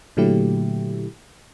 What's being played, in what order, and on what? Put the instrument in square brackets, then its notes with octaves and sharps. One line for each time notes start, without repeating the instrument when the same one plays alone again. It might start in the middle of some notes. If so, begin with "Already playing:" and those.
[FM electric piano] A#2 D3 F#3 A3 E4 G4